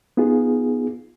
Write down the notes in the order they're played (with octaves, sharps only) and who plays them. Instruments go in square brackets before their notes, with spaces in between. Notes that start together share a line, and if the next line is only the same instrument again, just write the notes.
[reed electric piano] B3 D#4 F4 G#4